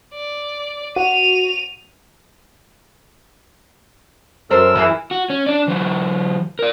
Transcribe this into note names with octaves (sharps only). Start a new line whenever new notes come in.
D5
F#4 D#7 F7
F#2 A4 A#4 C5 E6
E3 E4 G#4
F#4
C#4
D4 D5
E3 F#3
A#4 D5